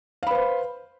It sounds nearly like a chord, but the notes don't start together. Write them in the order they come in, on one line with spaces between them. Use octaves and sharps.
F5 B5 B4 C5